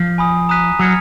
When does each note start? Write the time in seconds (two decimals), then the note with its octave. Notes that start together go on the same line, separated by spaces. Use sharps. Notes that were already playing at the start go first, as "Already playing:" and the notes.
Already playing: F3
0.18 G#5 B5 D#6
0.49 A#5 D#6 F#6 B6 D#7
0.79 F#3 F6 G#6 C#7 F7